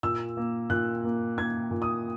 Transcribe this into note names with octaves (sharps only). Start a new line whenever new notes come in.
A#2 E6
A#3
A#2 F#6
A#3
A#3 G#6
A#2
D#6